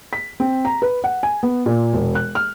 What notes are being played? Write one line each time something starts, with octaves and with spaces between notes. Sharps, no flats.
B6
C4
A#5
B4
F#5
G#5
B3
A#2
E1
F#6
F6